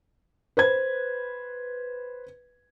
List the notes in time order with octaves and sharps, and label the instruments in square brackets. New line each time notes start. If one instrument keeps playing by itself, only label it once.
[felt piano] B4 C5 G#6